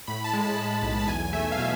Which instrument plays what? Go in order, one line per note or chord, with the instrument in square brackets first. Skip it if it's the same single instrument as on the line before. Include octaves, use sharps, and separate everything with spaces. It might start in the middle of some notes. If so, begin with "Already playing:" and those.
[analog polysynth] A2 B5
A5
G#3
A5
G#3
B1
A5
E2 G#5
A3 E5
F5
B2 E5